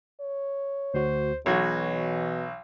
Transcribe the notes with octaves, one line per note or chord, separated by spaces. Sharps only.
C#5
D2 F#4 C5
B1 B2 E3 F#4 C#5 G#6